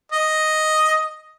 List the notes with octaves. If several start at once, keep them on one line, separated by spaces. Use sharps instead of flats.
D#5